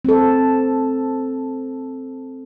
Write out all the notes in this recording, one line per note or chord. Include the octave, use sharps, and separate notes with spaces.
C4 A4